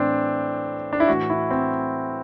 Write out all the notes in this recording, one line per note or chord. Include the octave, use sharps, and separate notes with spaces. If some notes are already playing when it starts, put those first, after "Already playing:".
Already playing: A2 E3 C4 D4
D4
E4
A2 E3 F#4
E4
C4